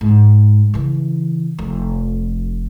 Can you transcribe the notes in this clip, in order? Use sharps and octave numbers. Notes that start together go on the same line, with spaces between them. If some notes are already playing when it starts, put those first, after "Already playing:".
G#2
C#3 E3
F1 F2